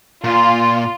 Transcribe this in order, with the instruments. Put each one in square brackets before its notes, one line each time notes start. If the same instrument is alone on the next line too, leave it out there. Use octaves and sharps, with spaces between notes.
[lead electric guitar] A#2 [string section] F4